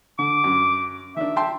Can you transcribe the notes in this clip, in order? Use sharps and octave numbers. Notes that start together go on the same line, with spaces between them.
D3 D6
F#2
D#3 D4 E5
G5 A5 C6